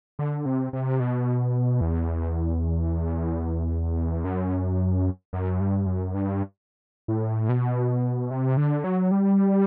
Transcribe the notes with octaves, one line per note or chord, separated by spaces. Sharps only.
D3
C3
C3
B2
E2
F#2
F#2
G2
F#2
G2
A2
B2
C3
D3
F#3
G3